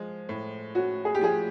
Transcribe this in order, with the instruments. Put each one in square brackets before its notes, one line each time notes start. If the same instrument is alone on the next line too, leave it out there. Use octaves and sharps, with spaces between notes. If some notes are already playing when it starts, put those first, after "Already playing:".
Already playing: [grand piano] F3 G#3
A2
[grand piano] C#4 [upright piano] F#4
[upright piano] G#4
G4
[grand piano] F3 [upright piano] G#4